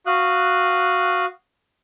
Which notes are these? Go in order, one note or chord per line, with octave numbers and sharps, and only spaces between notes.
F#4 F5 D#6 F#6